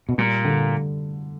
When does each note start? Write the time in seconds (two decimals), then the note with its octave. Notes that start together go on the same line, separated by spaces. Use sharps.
0.09 B2
0.18 A#2 G3
0.45 D3